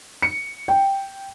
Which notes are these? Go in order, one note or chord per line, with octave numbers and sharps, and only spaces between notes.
C#7
G5